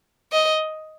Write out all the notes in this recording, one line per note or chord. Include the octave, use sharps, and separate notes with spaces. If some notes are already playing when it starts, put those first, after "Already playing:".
D#5